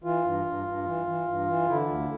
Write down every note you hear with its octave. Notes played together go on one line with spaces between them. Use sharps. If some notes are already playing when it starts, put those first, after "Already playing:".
E3 F4
G2
G2
G2
E3
E3
G2
E3
D3 E4
D2